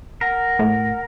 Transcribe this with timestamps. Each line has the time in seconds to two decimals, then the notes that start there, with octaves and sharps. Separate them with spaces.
0.21 A#4 F#5
0.59 A2